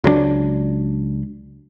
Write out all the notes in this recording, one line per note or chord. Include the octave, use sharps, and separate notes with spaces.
C#2 F#3 G#3 D4